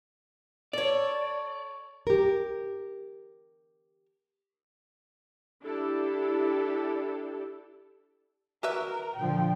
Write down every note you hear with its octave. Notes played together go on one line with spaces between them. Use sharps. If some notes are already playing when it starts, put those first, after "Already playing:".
A4 C#5 D5
G4 A#4
D4 E4 G4 A4
F#4 A#4 B4 E5
A#2 D3 F3 G5